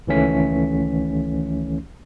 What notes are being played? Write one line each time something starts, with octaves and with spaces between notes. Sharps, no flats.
C#2 D#3 E3 A3 C#4 B6